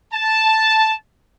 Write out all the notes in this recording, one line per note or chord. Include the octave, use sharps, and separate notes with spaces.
A5